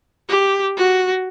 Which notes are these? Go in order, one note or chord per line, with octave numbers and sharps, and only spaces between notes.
G4
F#4